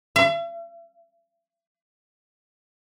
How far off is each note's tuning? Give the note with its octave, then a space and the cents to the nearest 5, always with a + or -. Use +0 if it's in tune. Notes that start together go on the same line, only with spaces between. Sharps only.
E5 +45